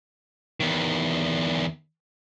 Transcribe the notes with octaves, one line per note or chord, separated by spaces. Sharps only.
E2 D#3